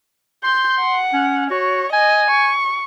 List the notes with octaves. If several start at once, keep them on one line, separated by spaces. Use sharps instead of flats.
C6 G6
F#5
C#4
F#4 C#5
D#5 G#5
C#6